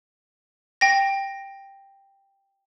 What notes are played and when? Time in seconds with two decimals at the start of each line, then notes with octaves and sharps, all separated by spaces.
0.81 G5 A#6